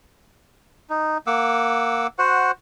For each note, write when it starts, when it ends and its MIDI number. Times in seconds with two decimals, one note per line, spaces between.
0.90 1.18 63
1.27 2.07 58
1.27 2.07 78
1.27 2.07 86
1.27 2.07 88
2.19 2.51 66
2.19 2.51 72
2.19 2.51 78